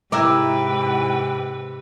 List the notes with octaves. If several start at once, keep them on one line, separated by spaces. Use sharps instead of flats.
G#2 C3 E4 A#4 B4 G5 D6 E6